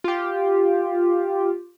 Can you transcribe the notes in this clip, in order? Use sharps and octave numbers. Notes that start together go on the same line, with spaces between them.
F4 G4